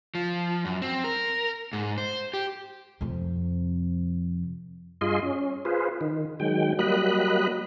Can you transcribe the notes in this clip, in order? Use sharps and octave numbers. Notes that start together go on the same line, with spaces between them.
F3
F#2
C4
A#4
G#2
C5
G4
F2 C3
G2 F4 G#4 D#5 C6
C#4
F4 G#4 B4 C5
D#3
D#3 F#3 G#3 G5
F#3 G3 A#3 D#5 B5 F#6